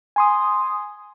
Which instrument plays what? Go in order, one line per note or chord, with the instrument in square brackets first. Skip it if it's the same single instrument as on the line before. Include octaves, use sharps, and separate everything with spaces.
[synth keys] G#5 C6 D#6